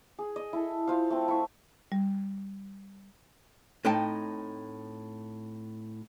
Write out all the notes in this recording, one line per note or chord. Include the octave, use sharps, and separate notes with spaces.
G#4
D#5
E4 A4
F4 C5 F5
A3 C4
E4 C#6
G3
A2 C4 D#4 G5 A5